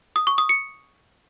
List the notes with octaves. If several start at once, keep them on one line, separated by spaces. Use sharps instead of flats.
D#6
C#6
D#6
C#7